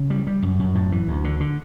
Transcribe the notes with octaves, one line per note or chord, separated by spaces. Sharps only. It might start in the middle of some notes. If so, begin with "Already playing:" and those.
Already playing: C#3
G3
G3
F#2
F#2
A2
E3
D2
D3
D3